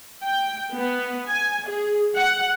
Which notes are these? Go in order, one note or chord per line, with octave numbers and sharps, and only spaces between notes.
G5
B3
G#5
G#4
F#5